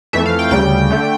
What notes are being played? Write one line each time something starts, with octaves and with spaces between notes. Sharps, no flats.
F2 E3 A3 E5
F5
G5
D2 C#3 G3 G5
D3 A3